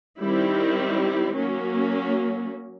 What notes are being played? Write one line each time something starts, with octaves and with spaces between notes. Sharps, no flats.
D#3 G3 C4 E4
F#3 A#3 C#4